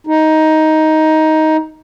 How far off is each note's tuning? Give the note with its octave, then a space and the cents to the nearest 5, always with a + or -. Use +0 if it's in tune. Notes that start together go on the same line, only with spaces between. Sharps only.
D#4 +10